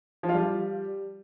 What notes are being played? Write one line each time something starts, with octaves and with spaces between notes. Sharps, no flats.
F3
F4
G3